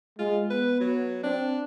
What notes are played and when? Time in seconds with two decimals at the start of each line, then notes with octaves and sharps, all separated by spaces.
0.19 G#3 F4
0.50 B3 B4
0.80 F#3
1.23 C4 D4